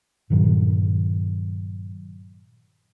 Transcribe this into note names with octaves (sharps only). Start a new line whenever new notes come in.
G2 A#2 D#3 F#3